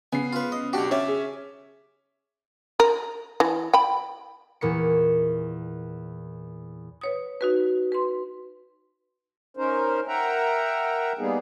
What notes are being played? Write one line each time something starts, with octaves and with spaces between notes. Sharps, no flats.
C#3 B3 G#5 C7
F4 B4
D#5
B1 D4 F#4 G4
C#4 C#5 D5 E5
G#4
A#4
E3
G5 B5
E2 A#2 A#3 C#6 C#7
B4 C#5 D#6
D#4 F#4 B4
B4 C6
C#4 D#4 A#4 C5
A#4 E5 F#5 G5 A#5
G3 A#3 B3 D#4 G#4